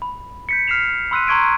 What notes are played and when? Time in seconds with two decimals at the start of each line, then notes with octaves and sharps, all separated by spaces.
0.02 B5
0.49 G6 B6 C#7
0.68 F6 B6 C7 E7 F7
1.11 B5 C6 E6 F#6 B6 D#7
1.27 A#5 C6 C#6 G#6 D7 D#7